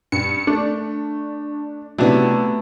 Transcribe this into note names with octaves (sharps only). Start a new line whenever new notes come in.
G2 C#7
A3 D4
C3 F#3 A3 B3 D4 E4